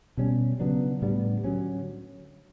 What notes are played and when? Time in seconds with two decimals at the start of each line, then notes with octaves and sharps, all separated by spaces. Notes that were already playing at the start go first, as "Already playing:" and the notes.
0.17 B2 G3 C#4
0.60 C#3 F#3 B3 D4
1.02 A2 G3 B3 D4
1.44 D3 F#3 C#4